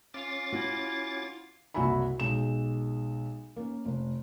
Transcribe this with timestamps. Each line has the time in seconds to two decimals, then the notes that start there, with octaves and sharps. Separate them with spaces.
0.14 C#4 F4 D6 A6
0.52 E4 F#4
1.74 F#1 C2 F#4 E5 G#5 B5
2.20 B1 G#3 E7
3.56 A#3 C#4
3.85 F1